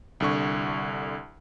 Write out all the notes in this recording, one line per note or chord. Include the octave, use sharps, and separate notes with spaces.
C2 D3 C#6